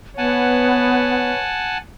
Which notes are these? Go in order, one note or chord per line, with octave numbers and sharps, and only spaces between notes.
B3 B4 C#5 F#5 G#5 A5